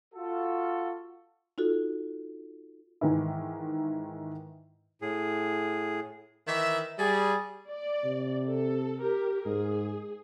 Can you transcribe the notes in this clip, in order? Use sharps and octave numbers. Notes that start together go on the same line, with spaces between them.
F4 F#4 A4
D#4 F4 F#4 A4
G#2 D#3 E3 E4
A2 G#4
D#3 E3 E5
G3 G#4
D5
C3
A4
G4 A#4
G#2 G#4